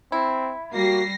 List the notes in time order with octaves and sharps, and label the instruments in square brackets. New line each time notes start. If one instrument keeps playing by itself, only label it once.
[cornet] C4 [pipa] E4
[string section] G3 A#6 C7 [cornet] A#3 [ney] F#4